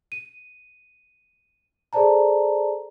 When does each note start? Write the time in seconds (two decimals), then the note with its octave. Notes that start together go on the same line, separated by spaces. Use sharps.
0.12 D#7
1.93 G#4 A4 C5 D5 A5 A#5